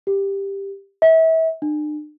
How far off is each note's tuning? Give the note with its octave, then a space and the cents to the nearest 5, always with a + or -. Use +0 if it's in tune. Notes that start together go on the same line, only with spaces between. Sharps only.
G4 +10
E5 -35
D4 +45